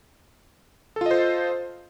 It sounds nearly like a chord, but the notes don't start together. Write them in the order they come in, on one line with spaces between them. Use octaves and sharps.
A4 F4 D#5 C5